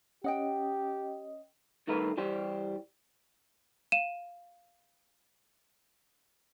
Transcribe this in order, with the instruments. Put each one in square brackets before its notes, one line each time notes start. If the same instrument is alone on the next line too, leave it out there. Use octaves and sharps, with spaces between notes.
[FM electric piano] C#4 D#5 [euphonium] G4 [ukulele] F#5 G5
[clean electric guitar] G2 D#3 A3 A#4 B4
E3 G3 G4 C5
[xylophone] F5 D#7 E7